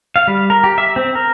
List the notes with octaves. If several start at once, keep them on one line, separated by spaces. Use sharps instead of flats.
F5
G3
A#4
G4
E5
C4
A#4